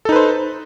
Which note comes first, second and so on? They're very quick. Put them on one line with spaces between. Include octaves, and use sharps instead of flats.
A4 D#4 B4 C5